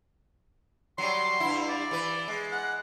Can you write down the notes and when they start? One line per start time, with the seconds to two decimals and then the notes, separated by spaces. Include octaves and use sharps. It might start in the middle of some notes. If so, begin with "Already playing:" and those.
0.98 F#3 G3 C6
1.40 G2 E4
1.68 D5
1.91 E3 B4
2.28 G#3
2.52 F#5